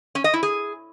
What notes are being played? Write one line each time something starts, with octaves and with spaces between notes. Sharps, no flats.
C#4
D#5
E4
G#4